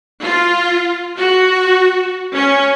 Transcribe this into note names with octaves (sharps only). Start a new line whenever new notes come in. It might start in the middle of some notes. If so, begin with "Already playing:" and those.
F4
F#4
C#4